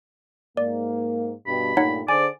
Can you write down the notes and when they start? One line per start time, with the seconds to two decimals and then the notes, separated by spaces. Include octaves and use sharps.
0.57 G#2 A#3 D5
1.47 G2 B2 G4 B5
1.77 G2 A#2 A3 D#4 C#5 F#5
2.08 D3 G#4 C5 D5 G#5